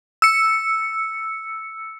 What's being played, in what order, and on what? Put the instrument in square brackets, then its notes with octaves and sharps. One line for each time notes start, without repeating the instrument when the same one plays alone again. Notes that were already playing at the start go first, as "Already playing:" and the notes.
[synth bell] E6 C#7